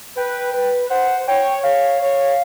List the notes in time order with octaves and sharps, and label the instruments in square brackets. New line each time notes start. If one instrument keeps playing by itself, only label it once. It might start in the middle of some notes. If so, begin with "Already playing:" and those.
[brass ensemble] B4 [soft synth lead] G5
[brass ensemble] B4
[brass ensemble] C5 [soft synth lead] F#5
[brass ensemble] C#5 [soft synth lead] G5
[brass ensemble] C#5 [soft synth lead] F5
[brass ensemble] C#5